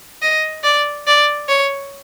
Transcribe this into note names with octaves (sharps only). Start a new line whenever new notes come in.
D#5
D5
D5
C#5